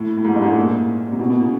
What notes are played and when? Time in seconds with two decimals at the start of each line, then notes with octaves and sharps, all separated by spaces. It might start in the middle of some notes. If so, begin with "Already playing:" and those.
Already playing: A2
0.17 A2
0.25 G#2
0.36 G2
0.42 G#2
0.45 A2
0.56 A#2
1.12 C3
1.19 B2
1.30 B2
1.41 C#3